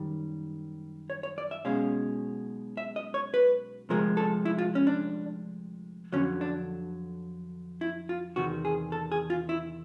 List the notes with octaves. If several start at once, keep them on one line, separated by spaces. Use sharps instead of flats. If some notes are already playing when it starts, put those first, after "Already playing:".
Already playing: F#2 D#3 G3
C#5
C#5
D5
E5
B1 B2 G#3 C#4 F5
E5
D#5
C#5
B4
D2 C3 F3 G#3 A#4
A4
E4
F4
C#4
D4
F2 D3 F#3 C#4
D4
E4
F4
E2 C3 D#3 F#4
G#4
A4
G#4
F4
E4